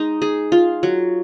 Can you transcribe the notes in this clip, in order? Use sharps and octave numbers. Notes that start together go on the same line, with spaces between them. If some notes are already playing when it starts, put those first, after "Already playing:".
Already playing: G#3 D#4
G#4
F4
F#3